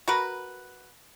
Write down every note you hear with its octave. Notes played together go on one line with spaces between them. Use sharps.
F#4 A#4 B4